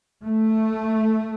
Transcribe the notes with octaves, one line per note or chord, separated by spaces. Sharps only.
A3